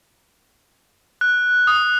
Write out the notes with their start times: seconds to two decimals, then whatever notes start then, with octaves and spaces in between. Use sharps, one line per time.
1.21 F#6
1.67 D#6